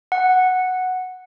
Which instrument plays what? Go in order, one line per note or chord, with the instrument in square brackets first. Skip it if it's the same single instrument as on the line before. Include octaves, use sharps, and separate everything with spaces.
[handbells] F#5